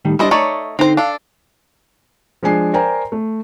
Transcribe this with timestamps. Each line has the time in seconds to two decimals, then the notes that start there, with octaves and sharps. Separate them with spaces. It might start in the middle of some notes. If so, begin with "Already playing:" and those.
0.05 A2 D#3 G3
0.19 G3 D4 E4 C5 D#5
0.31 A3 D#4 C#5 D5
0.79 D3 C4 D#4 C5
0.97 D4 A4 F5
2.43 F3 G#3 D4 G#5 C7
2.73 A#4 C5 D5 G5 G#5 A#5
3.12 A3